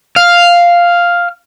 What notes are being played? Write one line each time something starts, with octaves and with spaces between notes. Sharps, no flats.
F5